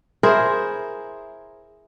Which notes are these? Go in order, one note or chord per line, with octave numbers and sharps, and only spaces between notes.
E4 G#4 A#4 C5